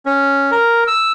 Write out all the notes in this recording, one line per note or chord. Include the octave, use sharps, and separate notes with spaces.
C#4
A#4
E6